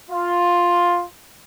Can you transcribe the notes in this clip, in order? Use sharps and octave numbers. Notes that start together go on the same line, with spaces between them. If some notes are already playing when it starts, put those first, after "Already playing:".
F4